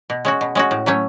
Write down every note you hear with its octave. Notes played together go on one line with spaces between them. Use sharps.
B2
G#3 C#4 F#4
B2
G#3 C#4 F#4
A2
F#3 A3 C#4